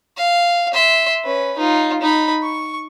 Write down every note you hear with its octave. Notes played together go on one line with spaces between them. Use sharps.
F5
E5 C6
C#4 B4
D#4 F4
D#4 B5
C#6